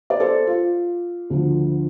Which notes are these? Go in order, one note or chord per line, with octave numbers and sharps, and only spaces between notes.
D5
A4 C5
F4
D2 D3 F3